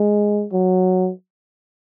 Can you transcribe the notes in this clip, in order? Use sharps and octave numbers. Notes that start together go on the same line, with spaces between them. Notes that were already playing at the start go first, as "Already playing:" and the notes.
Already playing: G#3
F#3